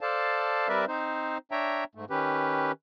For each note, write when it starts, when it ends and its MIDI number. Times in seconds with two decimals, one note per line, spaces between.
0.01 0.68 69
0.01 0.68 72
0.01 0.68 74
0.01 0.68 77
0.01 0.68 81
0.68 0.85 55
0.68 0.85 60
0.68 0.85 70
0.68 0.85 71
0.68 0.85 74
0.68 0.85 76
0.88 1.38 60
0.88 1.38 63
0.88 1.38 72
1.51 1.84 62
1.51 1.84 73
1.51 1.84 76
1.51 1.84 79
1.51 1.84 82
1.95 2.05 44
1.95 2.05 57
2.10 2.72 51
2.10 2.72 61
2.10 2.72 67
2.10 2.72 71